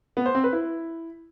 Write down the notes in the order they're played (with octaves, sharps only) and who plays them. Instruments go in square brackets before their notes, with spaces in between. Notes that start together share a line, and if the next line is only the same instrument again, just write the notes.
[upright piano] B3
C5
C4
B4
E4